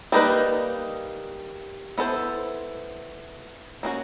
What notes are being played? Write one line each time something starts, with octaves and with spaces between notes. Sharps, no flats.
G3 A#3 D#4 F#4 B4
B3 E4 A4 C5
A#3 C#4 F#4